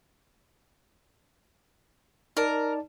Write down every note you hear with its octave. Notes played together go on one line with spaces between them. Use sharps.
D#4 A#4 D5 A5